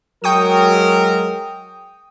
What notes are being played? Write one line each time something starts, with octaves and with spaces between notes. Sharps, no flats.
F#3 G#3 A#4 G5 C#6 D#6